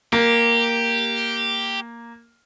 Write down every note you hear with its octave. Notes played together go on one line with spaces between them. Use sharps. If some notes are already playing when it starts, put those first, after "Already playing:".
A#3 G4